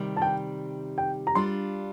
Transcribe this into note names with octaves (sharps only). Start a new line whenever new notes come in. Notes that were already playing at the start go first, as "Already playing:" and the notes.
Already playing: C3 D#3 G3
A5
G5
G5
A#5
G3 D4 F4 C6